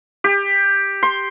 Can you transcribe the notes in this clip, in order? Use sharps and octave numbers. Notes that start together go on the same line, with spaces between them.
G4
C6